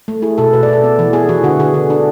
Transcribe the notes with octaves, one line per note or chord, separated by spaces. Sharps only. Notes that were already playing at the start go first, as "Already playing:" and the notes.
A3
E4 G#4
B2 A4
B2 B4
D5
B2 A4
B3
E3
B3 G#4
E3 F#4
D3 F#4
D3 G#4
D3
D4